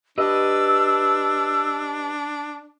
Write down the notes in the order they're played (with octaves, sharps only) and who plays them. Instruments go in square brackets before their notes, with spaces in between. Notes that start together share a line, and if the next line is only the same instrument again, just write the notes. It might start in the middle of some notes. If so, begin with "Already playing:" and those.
[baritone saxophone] D4 [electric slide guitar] G4 B4 D#5 [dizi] E6